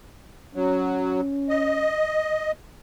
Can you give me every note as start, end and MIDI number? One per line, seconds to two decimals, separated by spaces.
0.55 1.21 54
0.55 1.92 61
1.49 2.52 75